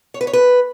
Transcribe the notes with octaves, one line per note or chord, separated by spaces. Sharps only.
C#5
B4
C#5
B4